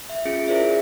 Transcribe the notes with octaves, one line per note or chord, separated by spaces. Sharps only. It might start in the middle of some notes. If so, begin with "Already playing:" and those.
E5
C#4 F4 G#4 C#7
E4 G#4 A#4 C5 D5 E5